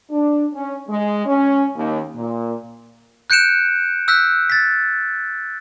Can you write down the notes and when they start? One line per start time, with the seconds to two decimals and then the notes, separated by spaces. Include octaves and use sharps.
0.10 D4
0.54 C#4
0.89 G#3
1.26 C#4
1.75 D#2
2.16 A#2
3.30 F#6 G6 C#7 D7 E7
4.08 E6 F#6 G6 B6
4.50 A6 B6